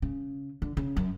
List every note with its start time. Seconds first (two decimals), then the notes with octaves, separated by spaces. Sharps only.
0.02 C#3
0.62 D3
0.77 C#3
0.97 F#2